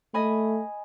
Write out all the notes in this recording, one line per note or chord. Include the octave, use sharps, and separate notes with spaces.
A3 D#5 G#5 B5